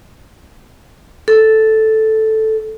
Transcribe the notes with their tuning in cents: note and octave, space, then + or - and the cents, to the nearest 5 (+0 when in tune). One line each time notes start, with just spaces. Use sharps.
A4 -5